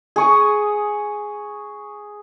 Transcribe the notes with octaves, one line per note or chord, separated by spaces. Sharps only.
G#4 C#6 D#6